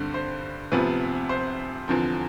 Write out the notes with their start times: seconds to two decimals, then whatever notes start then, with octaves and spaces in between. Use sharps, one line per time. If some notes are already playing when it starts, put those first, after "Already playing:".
Already playing: G2 D3 G3 C4 C5
0.14 C5
0.72 D2 C3 F3 B3 B4
1.29 C5
1.88 E2 D3 F3 C4